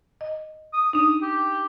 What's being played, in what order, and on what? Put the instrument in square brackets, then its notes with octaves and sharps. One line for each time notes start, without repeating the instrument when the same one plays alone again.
[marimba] D#5
[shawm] D#6
[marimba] D4 D#4 [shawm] D#6
[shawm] G4